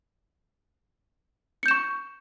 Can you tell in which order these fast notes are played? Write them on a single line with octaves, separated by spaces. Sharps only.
C#7 G6 E7 C#6